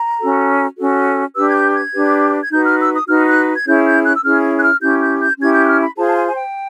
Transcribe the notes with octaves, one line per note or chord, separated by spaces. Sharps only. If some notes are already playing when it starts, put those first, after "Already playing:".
Already playing: A#5
C#4 F#4 A4
C#4 F#4 A4
D4 G4 B4 E6
G#6
G6
G#6
D4 G4 B4
G#6
D#4 F#4 B4 G6
F6
E6
D#6
D#4 F#4 B4 F6
F#6
G#6
C#4 E4 G#4 C#5 G6
G6
F#6
E6
C#4 E4 G#4 C#5 F6
F#6
F6
C#4 E4 G4 G6
G6
G6
C#4 E4 G4 G#6
G6
F#6
F6
B5
F4 G#4 C5 A5
A5
G#5
G#5
G5